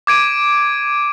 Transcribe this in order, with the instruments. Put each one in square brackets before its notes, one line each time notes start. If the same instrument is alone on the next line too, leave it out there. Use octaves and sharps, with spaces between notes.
[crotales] D6 G#6 D7 D#7